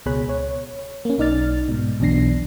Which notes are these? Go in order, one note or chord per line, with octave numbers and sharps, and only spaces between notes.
C#2 B2 G#4 C#5 B5 F#6
C#5
A#3 C#4
B1 D#4 D5 F6 A6
G#2 B2
B1 E2 B2 D4 A#6 C7